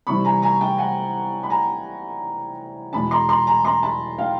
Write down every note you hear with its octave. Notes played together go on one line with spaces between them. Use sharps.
C3 E3 G3 B5 C#6
G#5 A#5
G#5 A#5
G5 A5
F#5 G#5
B5
G#5 A#5
E2 B2 G#3 A5 B5
A#5 C6
A#5 C6
G#5 A#5
A#5 C6
A5 B5
F5 G5